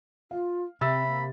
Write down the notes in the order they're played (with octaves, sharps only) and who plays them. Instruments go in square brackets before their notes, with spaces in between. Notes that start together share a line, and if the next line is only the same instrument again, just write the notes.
[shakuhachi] F4 [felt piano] F5
[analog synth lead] C3 [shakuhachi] C4 [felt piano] E5 E6 A6 [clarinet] B5
[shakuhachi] A#3